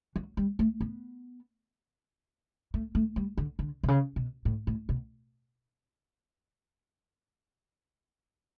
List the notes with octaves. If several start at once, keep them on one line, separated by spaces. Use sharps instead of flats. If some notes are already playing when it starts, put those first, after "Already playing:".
F#3
G3
A3
B3
A3
A3
G3
D3
D3
B2
C#3
B2
A2
A2
B2